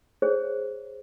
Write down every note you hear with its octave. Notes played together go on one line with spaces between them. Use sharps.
G#4 C5 C#5